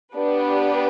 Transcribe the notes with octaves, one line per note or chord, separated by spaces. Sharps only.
B3 D4 G4 B4